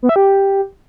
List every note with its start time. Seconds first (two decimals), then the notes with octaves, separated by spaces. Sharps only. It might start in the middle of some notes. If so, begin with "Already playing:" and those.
0.03 B3
0.09 E5
0.16 G4